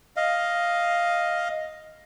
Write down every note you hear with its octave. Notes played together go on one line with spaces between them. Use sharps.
D#5 F5